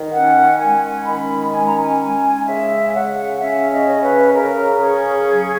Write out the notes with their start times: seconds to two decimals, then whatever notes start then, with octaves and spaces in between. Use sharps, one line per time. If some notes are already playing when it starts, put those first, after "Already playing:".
Already playing: D#3
0.12 C#4 F#5
0.60 G#3 G#5
1.06 D#3 B5
1.53 C#4 G#5
1.67 A#5
1.80 G#5
2.00 G#3
2.47 C#3 E5
2.94 C#3 F#5
3.41 C#4 E5
3.72 D#5
3.87 C#3
4.02 B4
4.34 C#3 A#4
4.81 C#4 G#4
5.27 F#3